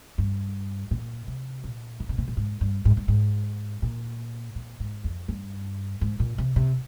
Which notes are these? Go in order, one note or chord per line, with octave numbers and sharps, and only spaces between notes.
G2
A#2
C3
A#2
D#3
C#3
C3
A#2
G#2
G2
G#2
G2
G#2
A#2
A#2
G#2
F2
G2
G#2
A#2
C3
C3